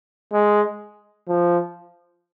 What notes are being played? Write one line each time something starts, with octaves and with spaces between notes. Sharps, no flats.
G#3
F3